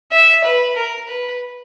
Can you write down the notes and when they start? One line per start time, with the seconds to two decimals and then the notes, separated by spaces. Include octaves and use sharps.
0.11 E5
0.45 B4
0.76 A#4
1.08 B4